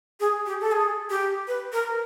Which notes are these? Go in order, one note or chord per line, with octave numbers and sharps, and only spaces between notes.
G#4
G4
A4
G#4
G4
B4
A#4